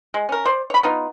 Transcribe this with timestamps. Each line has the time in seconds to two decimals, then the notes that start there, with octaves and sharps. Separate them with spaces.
0.14 G#3
0.29 C#4 A#4
0.46 C5 D5
0.70 C#5 B5
0.83 B3 D#4 F4